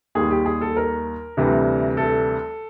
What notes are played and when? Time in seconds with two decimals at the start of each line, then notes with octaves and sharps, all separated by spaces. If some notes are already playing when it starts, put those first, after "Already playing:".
0.15 D#2 D#3 G3 G#4
0.30 G4
0.46 G#4
0.61 A4
0.77 A#4
1.37 D2 C3 E3 G3
1.97 A4